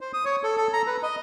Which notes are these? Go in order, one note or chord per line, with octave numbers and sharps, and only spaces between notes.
C5
D#6
C#5
A4
A4
A#5
B4
D#5